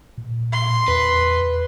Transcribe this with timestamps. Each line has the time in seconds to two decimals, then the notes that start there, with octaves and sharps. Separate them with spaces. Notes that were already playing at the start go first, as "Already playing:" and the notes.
0.18 A#2
0.52 C6
0.88 E2 B4